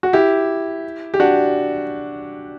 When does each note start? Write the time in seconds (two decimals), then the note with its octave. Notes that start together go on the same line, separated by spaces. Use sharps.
0.03 F#4
0.13 E4 G4
1.14 G4
1.20 D4 F#4